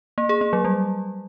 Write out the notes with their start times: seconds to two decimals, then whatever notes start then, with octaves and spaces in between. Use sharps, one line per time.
0.18 A#3
0.29 G#4
0.41 A#3
0.53 F#3
0.65 G3